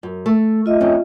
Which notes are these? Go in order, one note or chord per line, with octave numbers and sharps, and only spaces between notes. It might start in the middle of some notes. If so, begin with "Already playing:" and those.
F#2
A3
F4 D#5 E5
F2 C#4